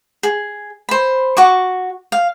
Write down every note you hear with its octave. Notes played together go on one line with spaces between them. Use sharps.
G#4
C5 B5
F#4 C#6 D6
F5